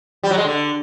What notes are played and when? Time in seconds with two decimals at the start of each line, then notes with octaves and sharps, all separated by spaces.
0.23 G3
0.31 F#3
0.38 G#3
0.45 D3